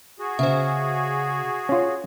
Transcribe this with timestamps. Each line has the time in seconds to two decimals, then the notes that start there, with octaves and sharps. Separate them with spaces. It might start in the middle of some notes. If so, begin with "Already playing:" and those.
0.19 F#4 G#4
0.39 C#3 C5 E5
1.69 C#4 F4